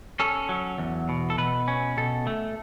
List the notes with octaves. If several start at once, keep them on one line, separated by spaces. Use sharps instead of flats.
C#4 A4
F#3
E2
B2
A4
B2 B4
C#4
B2 A4
A3